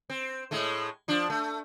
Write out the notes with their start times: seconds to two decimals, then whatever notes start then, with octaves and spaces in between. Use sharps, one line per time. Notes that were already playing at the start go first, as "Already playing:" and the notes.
0.10 C4
0.51 A2 G#3 A3
1.08 F3 D4
1.30 A3